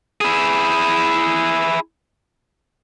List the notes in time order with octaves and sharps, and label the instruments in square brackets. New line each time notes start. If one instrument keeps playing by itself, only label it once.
[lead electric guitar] E4 G#4